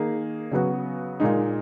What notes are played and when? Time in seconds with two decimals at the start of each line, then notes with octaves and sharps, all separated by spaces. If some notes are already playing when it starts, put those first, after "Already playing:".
Already playing: D#3 A#3 D#4 G#4
0.51 C#3 F#3 B3 F#4
1.20 A#2 G#3 D#4